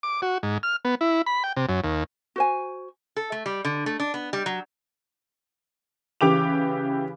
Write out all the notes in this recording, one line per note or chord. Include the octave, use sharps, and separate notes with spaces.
D6
F#4
G#2
F6
B3
E4
B5
G5
C3
F#2
D#2
F#4 C5 G#5
A4
A3
G3
D3
A3
D4
B3
G3
F#3
C#3 E3 G4 D6 F7